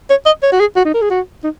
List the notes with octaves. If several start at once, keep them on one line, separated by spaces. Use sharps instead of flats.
C#5
D#5
C#5
F#4
G#4
F#4
D#4
A#4
G#4
F#4
D#4